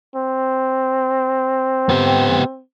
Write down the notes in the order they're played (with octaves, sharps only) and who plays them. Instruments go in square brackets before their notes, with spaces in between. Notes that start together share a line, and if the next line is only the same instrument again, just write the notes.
[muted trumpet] C4
[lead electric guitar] B3 G4